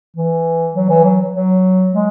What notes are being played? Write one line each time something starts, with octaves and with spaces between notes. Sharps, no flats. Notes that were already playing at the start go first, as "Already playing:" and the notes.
E3
F#3
E3
F#3
F#3
G#3